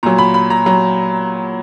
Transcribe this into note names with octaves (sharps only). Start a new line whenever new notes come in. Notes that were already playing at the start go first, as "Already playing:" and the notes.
A#2 F#3 A#5
B5
B5
A#5
F#3 A#5